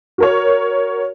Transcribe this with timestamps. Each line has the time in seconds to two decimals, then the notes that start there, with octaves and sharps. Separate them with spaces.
0.18 F#4 A#4 C#5